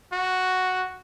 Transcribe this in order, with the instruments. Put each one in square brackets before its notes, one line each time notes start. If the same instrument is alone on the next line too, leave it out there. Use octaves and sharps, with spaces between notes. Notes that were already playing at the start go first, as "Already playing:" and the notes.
[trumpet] F#4